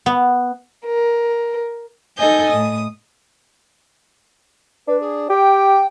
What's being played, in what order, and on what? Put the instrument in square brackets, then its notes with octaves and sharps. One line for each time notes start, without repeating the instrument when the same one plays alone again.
[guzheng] B3
[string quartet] A#4
D#4 A4 D#5 G#5 G6
A2 D#6
[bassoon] D4 [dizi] B4
[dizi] G#4
[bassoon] G4 [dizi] G5